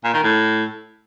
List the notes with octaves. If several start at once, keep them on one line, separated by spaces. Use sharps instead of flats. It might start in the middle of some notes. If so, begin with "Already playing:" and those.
A#2
D#3
A2